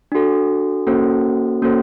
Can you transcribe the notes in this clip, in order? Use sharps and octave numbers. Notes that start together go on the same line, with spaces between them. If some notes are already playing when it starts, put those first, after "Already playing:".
D4 F#4 A4
A#3 C#4 F#4 A4 C5
A#3 C#4 F#4 A4 C5